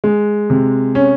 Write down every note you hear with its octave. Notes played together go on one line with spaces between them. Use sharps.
G#3
C3
C#4